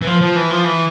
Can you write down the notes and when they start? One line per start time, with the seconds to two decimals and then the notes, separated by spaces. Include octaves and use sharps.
0.02 E3
0.07 F3
0.21 F3
0.36 E3
0.50 F3
0.64 E3